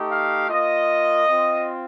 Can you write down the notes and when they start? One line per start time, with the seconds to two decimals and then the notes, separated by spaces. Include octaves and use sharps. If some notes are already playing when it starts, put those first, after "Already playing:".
Already playing: A3 D#4 G4
0.11 F5
0.49 A#3 F4 D#5
1.27 C4 F4